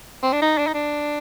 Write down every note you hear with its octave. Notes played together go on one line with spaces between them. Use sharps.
C4
D4
D#4
D4
D#4
D4